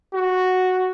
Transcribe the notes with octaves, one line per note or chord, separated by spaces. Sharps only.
F#4